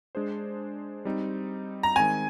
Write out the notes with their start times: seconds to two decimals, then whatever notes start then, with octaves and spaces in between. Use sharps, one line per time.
0.15 G#3 D4 G#4 C5
1.05 G3 C4 D#4
1.83 A#5
1.96 D#3 G#3 C4 G#5